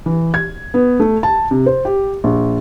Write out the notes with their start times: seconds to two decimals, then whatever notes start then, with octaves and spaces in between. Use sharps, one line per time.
0.06 E3
0.34 G#6
0.74 B3
1.00 A3
1.23 A5
1.51 C3
1.66 C5
1.85 G4
2.24 A#1